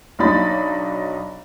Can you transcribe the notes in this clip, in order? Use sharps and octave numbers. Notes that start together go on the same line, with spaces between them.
B1 F#3 D4 D#4 B5 A6